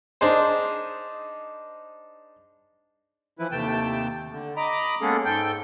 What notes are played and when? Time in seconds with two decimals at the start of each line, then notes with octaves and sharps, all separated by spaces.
0.21 D4 D#4 G#4 C5
3.39 E3 F3 E4 B4
3.51 D#2 C3 A3 G5 A5
4.31 D3
4.57 D#5 A#5 B5 D6
5.01 G#3 A#3 B3 C#4 G#4 A4
5.25 G#2 A4 G5 G6